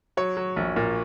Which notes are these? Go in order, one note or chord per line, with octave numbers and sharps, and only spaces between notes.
F#3 C#5
F#3
A#1
A#2